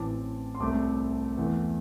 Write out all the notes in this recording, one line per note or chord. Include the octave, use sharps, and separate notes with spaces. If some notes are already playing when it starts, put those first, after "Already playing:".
Already playing: A1 A2 E3 C4 A5 D6
C6
C2 C3 A3 C4 A5 D6
E2 E3 A3